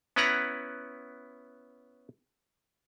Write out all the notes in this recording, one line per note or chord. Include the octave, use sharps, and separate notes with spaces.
B3 C#4 E4 B4 F#5 A#5